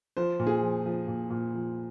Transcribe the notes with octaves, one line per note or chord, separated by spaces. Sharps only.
F3 C5
A#2
G#4
F3
F3
A#2
A#2
F3